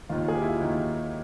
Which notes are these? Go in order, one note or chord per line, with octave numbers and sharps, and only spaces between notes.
D#2 D#3 F4
G#4
G4
E4
F4
D#2 D#3